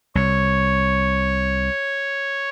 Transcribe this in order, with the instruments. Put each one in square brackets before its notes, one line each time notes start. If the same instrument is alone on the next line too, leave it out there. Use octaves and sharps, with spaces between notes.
[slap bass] C2 [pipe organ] C#5